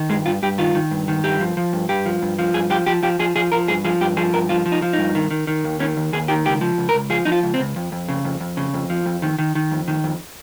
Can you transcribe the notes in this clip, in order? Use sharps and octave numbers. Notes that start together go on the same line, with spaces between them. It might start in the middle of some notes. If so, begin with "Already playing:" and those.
Already playing: D#3
G2 G#3
G2 F4
G2 G4
D#3 F4
D#3
G2
D#3
G2 G4
F3
F3
G2
G2 G4
F3
G2
F3
G2 G#4
F3 G4
F3 G4
F3 G4
F3 G#4
F3 G#4
F3 A#4
G2 G#4
F3 G#4
G2 G4
F3 G#4
G2 A#4
F3 F4
F3
D#4
F3
D#4
G2
D#3
D#3
D#3
D#2
D#3 C#4
D#2
D#2 G#4
D#3 G4
C#2 G4
F3
C#2
A#4
C#2
F3 G#4
F3 D#4
F4
C#2
C4
C#2
F2
F2
C#3
F2
F2
C#3
F2
F3
F2
D#3
D#3
D#3
F2
D#3
F2